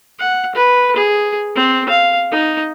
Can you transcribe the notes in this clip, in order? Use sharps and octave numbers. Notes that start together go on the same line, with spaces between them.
F#5
B4
G#4
C4
F5
D#4